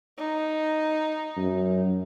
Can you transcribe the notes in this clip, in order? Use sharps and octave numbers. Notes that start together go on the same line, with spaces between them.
D#4
F#2